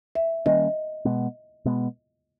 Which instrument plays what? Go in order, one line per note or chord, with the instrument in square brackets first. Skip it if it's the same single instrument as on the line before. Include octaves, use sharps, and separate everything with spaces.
[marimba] E5
[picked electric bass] D#3 G3 A#3 C#4 [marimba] D#5
[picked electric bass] B2 G#3 B3
B2 G#3 B3